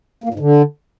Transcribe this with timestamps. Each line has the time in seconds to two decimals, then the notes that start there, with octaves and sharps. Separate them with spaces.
0.24 A#3
0.29 A#2
0.34 G#2
0.39 D3